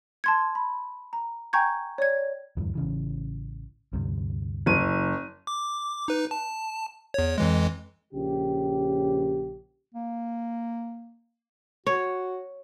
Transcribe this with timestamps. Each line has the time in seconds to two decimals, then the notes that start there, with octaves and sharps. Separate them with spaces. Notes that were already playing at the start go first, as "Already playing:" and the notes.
0.24 A5 C6 G#6
0.55 B5
1.13 A#5
1.53 G5 G#5 A#5 C#6 G6 G#6
1.98 C#5 D5 G#6
2.57 D1 E2 G2
2.75 A1 C#3 E3
3.93 D2 G2 C3
4.66 F#1 D#7
5.47 D6
6.08 D#4 B4
6.31 A5
7.14 E2 C#5
7.38 F2 E3 G#3
8.14 A#1 C#3 G4
9.95 A#3
11.87 F#4 C#5